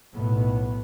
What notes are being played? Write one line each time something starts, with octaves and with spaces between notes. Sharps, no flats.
B1 A2 B3